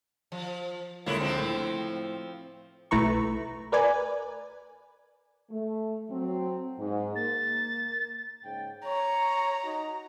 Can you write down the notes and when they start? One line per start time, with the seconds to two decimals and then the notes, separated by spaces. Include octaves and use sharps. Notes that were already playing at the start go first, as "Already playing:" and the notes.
0.32 F3
1.06 C#2 D3 A#3 E4 F4 C#5
1.20 F3 C4
1.39 A2
2.91 B1 A3 E4 B4 A#5 C#6
3.72 A#4 B4 D5 G#5
5.51 A3
6.09 F#3 C4
6.79 G#2
7.16 A#3 A6
8.44 G#2 C#3 G5
8.85 C#5 A#5
9.62 D#4 F#4